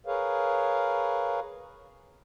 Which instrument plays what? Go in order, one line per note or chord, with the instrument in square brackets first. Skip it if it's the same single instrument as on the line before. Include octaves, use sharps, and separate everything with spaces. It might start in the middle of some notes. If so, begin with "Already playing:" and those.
[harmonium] G#4 A#4 B4 C#5 F5